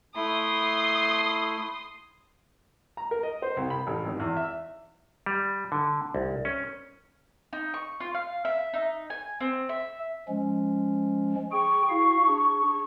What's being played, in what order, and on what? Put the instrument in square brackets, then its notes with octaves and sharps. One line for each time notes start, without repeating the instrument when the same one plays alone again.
[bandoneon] A3 E4 [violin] C6 D#6
[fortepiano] A#5
A#4
D#5
C5
C2
B5
A1
G#1
E2
E5
[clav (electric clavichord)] G3
D3
C2
C#4
[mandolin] D#4
C#6
F4
F5
E5
D#4
G#5
C4
E5
[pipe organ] F3 G#3 C#4
[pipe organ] G#4 G5 [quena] C#6
[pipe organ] E4 F#4 F5
D4 G#4